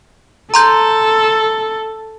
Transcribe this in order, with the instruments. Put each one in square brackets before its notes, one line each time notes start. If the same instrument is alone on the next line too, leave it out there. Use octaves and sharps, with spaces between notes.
[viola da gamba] A4 [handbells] A#5 C6 G6